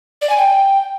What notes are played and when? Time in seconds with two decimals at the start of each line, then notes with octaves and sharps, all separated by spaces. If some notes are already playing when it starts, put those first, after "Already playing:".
0.22 D5
0.30 G#5
0.37 G5